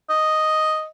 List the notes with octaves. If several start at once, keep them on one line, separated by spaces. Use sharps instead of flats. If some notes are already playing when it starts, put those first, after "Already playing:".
D#5